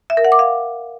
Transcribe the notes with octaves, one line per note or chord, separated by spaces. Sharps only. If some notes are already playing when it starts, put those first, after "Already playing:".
E5
A#4
F#5
D6
F5